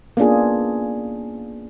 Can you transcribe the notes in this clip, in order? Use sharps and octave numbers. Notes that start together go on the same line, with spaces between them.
A#3 B3 C#4 D4 F4 G#4